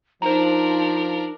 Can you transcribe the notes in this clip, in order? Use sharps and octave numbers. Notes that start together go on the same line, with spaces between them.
F3 D4 D#4 A#4 C5 A#5